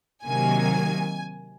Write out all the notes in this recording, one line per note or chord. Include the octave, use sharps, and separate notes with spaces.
C3 D#3 F#3 A#3 G#5